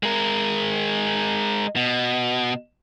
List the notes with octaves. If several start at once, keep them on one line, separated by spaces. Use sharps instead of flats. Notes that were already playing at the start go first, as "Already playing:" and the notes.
G#3 A#4
B2